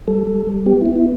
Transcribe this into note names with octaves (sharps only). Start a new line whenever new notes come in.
G3 A4
G3
G3
B3 G4
B3 E4
E4